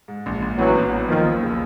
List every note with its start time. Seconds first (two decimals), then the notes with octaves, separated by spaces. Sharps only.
0.08 G#2
0.26 A#1
0.42 A#1
0.59 A1 E3 F#3
0.75 B3
0.92 F#3
1.08 D#2 D#3 F3
1.25 D#2
1.43 C#3